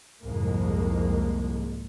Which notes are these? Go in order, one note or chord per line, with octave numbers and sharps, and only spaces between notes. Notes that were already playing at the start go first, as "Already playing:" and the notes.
C2 F2 G#2 G#3 A#3